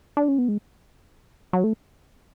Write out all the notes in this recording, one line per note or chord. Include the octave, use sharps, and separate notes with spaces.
D4
C#4
B3
G#3
F#3
A3